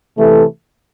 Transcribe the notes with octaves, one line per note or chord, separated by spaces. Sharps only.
C3 E3 A3